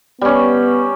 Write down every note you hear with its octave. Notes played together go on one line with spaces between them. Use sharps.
G3 B3 C#4